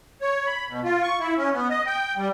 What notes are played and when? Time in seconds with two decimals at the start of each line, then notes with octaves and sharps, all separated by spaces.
0.21 C#5
0.47 B5
0.69 B2
0.84 F4
1.02 C#6
1.19 E4
1.37 C#4
1.53 B3
1.70 D#5
1.86 G5
2.16 G3